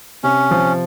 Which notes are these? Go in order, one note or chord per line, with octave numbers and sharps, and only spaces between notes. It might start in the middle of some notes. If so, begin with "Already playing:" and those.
C3 C#4
F3